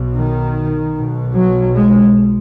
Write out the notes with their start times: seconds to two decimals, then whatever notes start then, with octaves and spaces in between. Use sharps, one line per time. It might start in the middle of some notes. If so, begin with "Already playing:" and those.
Already playing: B1 B2
0.14 D#3
0.95 B1 B2
1.34 F#3
1.74 G#3